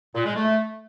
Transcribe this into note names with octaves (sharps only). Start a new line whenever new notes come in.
A#2
G#3
A3